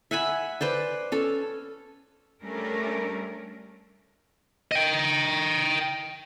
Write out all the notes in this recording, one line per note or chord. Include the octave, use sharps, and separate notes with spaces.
E5 F#5 G#5 B5
B4 C5 D5
C#4 A4
G3 A3 C#4 D4 A#4
D#5 G5